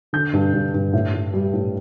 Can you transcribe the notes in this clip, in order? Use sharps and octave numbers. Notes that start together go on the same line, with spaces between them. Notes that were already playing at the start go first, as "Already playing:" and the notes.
D3 G6
G2
G2
G2
A2
A2
G3
A2